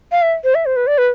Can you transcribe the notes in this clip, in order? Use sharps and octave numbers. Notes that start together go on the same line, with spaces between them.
F5
E5
C5
E5
C5
B4
D5
B4